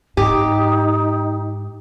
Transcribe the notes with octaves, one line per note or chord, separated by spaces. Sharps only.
G#2 D#4 G4